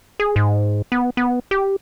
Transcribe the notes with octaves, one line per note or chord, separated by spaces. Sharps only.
G#4
G#2
B3
B3
G4